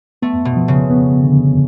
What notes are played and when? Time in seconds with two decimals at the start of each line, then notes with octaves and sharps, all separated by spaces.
0.22 A3 B3
0.45 B2
0.56 F3
0.68 C#3
0.90 B3
1.24 D3